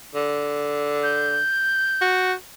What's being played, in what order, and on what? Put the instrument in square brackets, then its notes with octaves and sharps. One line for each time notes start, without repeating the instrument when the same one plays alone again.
[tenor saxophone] D3
[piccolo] G6
[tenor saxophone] F#4